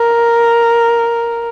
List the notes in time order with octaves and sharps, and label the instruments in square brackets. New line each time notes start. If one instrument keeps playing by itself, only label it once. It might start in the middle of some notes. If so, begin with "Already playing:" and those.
Already playing: [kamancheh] A#4